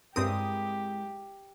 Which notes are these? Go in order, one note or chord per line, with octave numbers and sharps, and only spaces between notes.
G2 G#3 C4 E4 G4 A#4 D#6